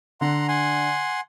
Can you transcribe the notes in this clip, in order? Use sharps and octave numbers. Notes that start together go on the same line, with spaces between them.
D3 F#5 A#5 C6
F#5 G#5 C6